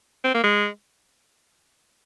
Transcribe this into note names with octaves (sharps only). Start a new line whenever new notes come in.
C4
A#3
G#3